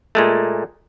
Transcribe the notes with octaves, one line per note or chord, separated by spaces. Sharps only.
A#2 G#3 A3